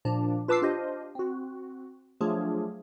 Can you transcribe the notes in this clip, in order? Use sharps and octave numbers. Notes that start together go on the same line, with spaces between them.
A#2 F3 D4
F4 B4 A5 D6 E6 C7
D4 F4 G4 C5 D#5
C4 F#4
F3 F#3 A3 D4 F4 G#4